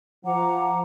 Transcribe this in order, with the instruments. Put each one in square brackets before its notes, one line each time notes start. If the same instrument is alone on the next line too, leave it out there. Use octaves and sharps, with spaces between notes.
[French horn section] F3 [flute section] F#5 A#5 D6